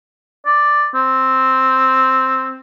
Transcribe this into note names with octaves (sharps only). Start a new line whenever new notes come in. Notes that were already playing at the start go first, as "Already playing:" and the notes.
D5
C4